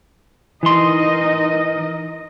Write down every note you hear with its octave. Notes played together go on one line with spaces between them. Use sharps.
E3 D#4 A#4 D#5 C6